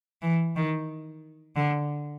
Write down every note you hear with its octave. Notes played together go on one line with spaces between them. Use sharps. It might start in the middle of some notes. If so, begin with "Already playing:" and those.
E3
D#3
D3